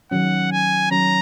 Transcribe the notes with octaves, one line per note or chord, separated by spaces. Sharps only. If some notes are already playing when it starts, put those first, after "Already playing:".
D#3 F#3 C#4 F#5
G#5
D#3 F#3 C#4 A#5